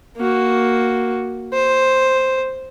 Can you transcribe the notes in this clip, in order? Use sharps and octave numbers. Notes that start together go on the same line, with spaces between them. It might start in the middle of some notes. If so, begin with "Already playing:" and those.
A#3 F#4
C5